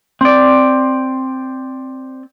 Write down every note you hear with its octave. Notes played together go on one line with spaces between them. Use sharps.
C4 D5